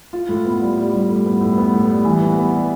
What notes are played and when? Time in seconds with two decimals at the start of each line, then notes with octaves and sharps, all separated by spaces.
0.13 F4
0.29 A2
0.45 B3
0.61 G3
0.78 G3
0.93 G3
1.09 A2
1.26 B3
1.41 A2
1.58 B3
1.73 A2
1.89 G3
2.05 E3
2.22 B3
2.38 B3
2.53 G3